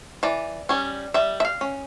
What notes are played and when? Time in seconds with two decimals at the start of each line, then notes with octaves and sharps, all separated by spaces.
0.23 E3 D5
0.69 G3 C#4
1.14 G3 E5
1.40 E5
1.45 F5
1.61 C#4